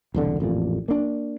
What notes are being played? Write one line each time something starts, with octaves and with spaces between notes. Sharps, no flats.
E1 C2 D3
A1 F2 A#2
A#3 D4